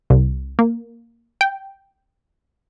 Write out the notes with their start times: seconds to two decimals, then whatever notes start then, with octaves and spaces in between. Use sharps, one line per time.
0.10 C2
0.59 A#3
1.41 G5